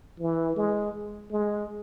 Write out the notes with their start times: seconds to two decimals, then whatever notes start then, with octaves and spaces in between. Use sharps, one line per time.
0.20 E3
0.56 G#3
1.31 G#3